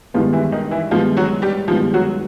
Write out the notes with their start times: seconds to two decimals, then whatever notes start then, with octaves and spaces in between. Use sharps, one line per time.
0.14 G2 D#3 F3 G#3 B3 F4
0.33 E3 E4
0.52 D#3 D#4
0.71 E3 E4
0.91 G2 D#3 F3 G#3 B3 F4
1.17 F#3 F#4
1.42 G3 G4
1.68 G2 D#3 F3 G#3 B3 F4
1.94 F#3 F#4